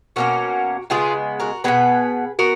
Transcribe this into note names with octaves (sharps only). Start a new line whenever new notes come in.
B2 A#3 C#4 F#4 A#4
C#3 G#3 B3 F4 G#4
F#4 A#4
B2 G#3 B3 G#4 B4
B3 F#4 A#4